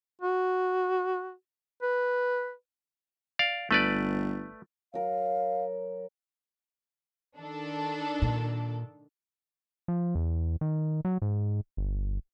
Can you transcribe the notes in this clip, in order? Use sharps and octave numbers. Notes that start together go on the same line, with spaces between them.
F#4
B4
D5 F5
G1 A3 B4 D5
F#3 A#4 F5
D#3 D4 A4
A#2
F3
E2
D#3
F#3
G#2
G1